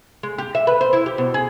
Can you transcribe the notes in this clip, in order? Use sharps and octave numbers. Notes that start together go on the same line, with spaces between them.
G#3
G4
E5
B4
C5
E4
G4
B2
G#4